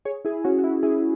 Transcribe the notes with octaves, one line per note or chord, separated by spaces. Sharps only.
G#4 C#5
E4 G#4
C#4 F#4
F#4
E4
E4 G#4